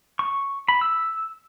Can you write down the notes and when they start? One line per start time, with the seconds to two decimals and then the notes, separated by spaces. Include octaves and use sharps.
0.19 C#6
0.68 B5
0.81 E6